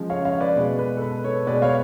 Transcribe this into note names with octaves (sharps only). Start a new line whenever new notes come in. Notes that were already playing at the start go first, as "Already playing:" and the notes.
Already playing: C#3 F3 G#3
C#5 F5
C#5 F5
B4 D5
B2 G#3
B4
A4
B4
A4 C#5
B2 G#3 B4 D5
C#5 F5